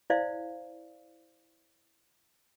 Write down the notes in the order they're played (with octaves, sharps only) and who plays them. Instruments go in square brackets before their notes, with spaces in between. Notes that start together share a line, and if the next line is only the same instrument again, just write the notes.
[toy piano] E4 C5 D5 F5